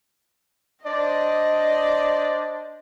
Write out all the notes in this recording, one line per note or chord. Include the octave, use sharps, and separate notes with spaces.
D4 C5 D5 D#5